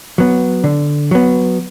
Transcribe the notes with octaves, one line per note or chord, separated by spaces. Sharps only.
F#3 B3
D3
F#3 B3